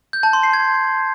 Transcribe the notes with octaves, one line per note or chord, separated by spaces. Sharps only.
G6
A5
C6
C7
G#6